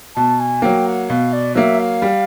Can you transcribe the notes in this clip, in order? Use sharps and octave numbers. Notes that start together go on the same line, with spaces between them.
B2 A5
G#5
F#3 A#3 G5
F#5
B2 F5
D5
F#3 A#3 E5
F5
G3